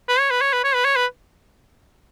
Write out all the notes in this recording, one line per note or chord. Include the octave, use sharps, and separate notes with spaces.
B4
C#5
B4
C#5
B4
C#5
B4
C#5
B4